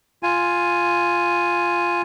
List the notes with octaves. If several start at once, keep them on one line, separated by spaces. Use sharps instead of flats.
F4 G#5